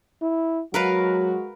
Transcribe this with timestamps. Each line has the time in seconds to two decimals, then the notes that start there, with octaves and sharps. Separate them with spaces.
0.22 E4
0.74 F#3 G#3 F#4 A#4 B4 F5